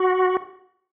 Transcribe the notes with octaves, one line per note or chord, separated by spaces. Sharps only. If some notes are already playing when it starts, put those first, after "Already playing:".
Already playing: F#4